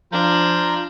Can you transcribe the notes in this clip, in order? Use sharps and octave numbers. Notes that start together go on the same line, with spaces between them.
F3 D4 F4 A#5 G6